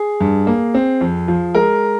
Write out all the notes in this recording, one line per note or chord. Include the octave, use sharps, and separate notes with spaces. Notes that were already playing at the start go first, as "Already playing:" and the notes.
Already playing: G#4
G2
A#3
C4
F2
F3
G#3 A#4